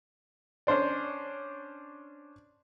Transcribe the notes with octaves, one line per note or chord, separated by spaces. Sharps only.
C#4 D4 C5 D5